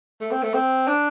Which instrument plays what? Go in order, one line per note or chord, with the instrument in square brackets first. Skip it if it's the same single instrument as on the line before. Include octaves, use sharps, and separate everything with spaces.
[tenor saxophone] A3
C4
A3
C4
D4